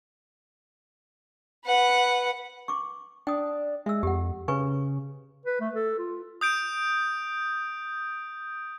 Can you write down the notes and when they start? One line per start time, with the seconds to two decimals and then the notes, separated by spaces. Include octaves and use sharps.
1.65 B4 F#5
2.68 C#6 D6
3.27 D4 G5 D#6
3.86 G#3 E5 E6
4.03 F2 G4 F#5
4.48 C#3 B4 G#5 C#6
5.46 B4
5.60 A3
5.75 A4
5.99 F4
6.41 D#6 G6 D7